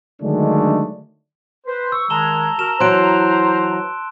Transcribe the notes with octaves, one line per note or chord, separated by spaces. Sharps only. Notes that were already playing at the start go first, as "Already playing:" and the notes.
D3 D#3 F#3 G#3 A3 D4
B4 C5
C#6 E6
D#3 G#3 A5 A#5 E7 G7
F#4 A#4 E7
E3 F#3 C5 C6 F#6 D7